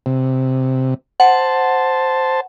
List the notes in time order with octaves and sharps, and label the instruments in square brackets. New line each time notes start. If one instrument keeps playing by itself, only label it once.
[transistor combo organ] C3
[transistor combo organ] C5 A5 [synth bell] F#5